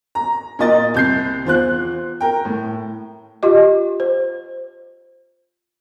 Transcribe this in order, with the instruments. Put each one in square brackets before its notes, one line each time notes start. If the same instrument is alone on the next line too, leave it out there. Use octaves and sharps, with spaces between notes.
[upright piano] A#5
A#2 A#4 D#5 A6
C2 G6 C7
E2 F4 C5 F#6
A#4 G5
A2
[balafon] F4 G4 D#5
C5